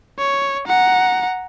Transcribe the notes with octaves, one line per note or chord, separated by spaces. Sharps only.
C#5
F#5 A#5